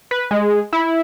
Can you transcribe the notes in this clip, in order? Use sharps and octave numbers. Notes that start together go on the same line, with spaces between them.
B4
G#3
E4